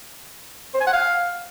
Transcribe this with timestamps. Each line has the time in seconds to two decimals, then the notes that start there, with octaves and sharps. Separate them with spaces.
0.74 C5
0.80 G#5
0.87 F#5
0.93 F5